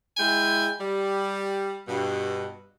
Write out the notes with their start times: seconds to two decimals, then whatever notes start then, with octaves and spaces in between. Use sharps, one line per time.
0.17 G#3 E4 G5 G#5
0.79 G3
1.86 G2 B2